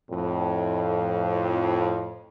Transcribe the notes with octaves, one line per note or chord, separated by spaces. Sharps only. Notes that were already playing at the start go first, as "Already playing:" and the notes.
F2 A2